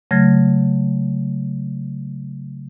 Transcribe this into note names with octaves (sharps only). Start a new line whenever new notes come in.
C#3 F#3 A3 F6 G#6 A#6